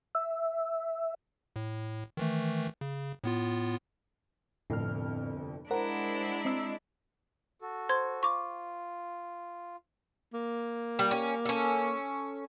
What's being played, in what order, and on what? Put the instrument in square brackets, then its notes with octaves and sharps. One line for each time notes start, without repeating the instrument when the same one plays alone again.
[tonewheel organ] E5
[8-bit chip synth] A2
D#3 E3 A3
C#3
A2 B3 F4
[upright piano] G1 C2 F2 [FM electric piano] A2 F6
[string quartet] G#3 D4 E4 [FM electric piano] A#4 C5 F#5 [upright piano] A#5
[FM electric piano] C4 D#5 E6
[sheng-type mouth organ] F#4 A4
[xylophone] C5 C6 G#6
[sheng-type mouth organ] F4 [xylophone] C#6 D6
[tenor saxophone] A#3
[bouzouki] G3
C#4
C#4 A4